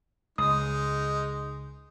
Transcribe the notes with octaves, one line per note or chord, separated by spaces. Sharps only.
C#2 G#3 D#4 D#6